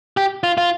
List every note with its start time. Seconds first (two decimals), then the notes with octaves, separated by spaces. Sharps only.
0.17 G4
0.44 F4
0.58 F4